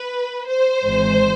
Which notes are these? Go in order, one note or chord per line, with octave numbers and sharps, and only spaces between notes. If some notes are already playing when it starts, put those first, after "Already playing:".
Already playing: B4
C5
G#1 G#2 E3